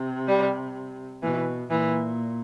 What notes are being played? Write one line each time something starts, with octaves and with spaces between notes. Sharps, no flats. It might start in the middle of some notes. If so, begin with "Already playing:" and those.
Already playing: C3
G3
B2 E3
A#2 E3